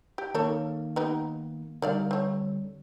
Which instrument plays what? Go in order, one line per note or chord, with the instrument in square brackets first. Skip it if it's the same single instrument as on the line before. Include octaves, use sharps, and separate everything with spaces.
[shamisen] G4 [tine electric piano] G5
[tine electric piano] D#3 A#3 [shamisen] D#4 A4 C#5
[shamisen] B3 D#4 G4
[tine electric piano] D3 G3 [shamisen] D#3 D5 F5
[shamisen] C4 C#5